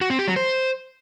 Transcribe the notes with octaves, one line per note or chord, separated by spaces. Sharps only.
F#4
C4
G4
F#3
C5